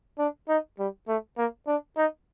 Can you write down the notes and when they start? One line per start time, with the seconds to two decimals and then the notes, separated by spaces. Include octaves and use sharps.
0.19 D4
0.48 D#4
0.79 G3
1.08 A3
1.37 A#3
1.67 D4
1.97 D#4